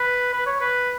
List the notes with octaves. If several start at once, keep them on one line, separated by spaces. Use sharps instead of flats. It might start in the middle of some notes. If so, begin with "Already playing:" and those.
Already playing: B4
B4
C#5
B4